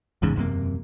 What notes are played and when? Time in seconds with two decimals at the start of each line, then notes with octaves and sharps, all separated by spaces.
0.22 A1 E2 G#2 C#3
0.36 E1 F#2 C3 A#3